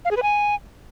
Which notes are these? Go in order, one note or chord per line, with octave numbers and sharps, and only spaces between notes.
F5
G#4
B4
G#5